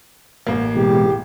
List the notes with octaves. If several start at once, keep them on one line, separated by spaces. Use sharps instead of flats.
A1 A#3
B2 E3 G#3 G4